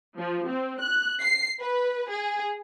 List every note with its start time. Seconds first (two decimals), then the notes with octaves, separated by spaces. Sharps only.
0.17 F3
0.47 C4
0.80 F#6
1.21 C7
1.59 B4
2.10 G#4